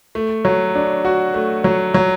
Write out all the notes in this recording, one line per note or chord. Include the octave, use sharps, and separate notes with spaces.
A3
F#3
D4
F#4
A3
F#3
F#3